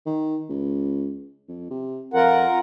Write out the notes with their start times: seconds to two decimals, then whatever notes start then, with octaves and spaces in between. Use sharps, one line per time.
0.06 D#3
0.49 C#2
1.48 F2
1.70 C3
2.14 F2 F4 A#4 F#5